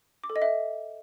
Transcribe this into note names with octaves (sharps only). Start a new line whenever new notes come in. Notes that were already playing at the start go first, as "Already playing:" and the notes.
D6
A4
D#5
E5